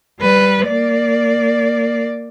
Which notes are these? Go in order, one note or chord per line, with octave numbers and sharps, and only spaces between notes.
G3 B4
A#3 D5